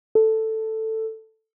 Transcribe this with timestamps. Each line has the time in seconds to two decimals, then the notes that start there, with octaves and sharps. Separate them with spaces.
0.15 A4